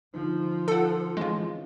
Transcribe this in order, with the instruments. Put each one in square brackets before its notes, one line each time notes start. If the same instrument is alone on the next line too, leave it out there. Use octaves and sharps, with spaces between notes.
[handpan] D3 D#4 [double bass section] F3
[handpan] F4 [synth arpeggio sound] A4 F#5
[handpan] E3 C4 C#4 [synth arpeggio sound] G#3 F4